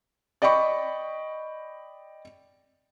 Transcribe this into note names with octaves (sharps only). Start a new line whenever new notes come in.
D5 D#5 G5 B5 C#6